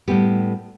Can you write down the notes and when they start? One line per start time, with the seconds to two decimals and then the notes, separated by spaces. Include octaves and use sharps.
0.08 A2 G3 B3 G4